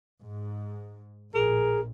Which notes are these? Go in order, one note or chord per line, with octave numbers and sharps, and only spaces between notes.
G#2
A#1 A2 G#4 A#4